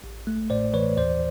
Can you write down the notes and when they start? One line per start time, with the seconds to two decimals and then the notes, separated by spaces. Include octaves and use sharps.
0.04 A1
0.27 A3
0.50 A2 C5 D5
0.74 E3 B4 C#5
0.97 D#2 C5 D5